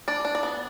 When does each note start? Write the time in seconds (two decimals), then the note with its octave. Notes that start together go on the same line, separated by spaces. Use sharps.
0.08 D4 D5
0.25 D4
0.35 D5
0.43 B3